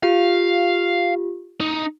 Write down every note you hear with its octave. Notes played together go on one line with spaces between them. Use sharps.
F4 G4 F5
D#4